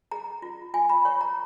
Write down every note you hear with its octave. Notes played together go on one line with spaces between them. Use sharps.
G#4 A#5
F4
F4 G#5
B5
C#5 C#6
A#5